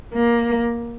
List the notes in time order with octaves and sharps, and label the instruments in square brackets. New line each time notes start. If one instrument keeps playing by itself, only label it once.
[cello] A#3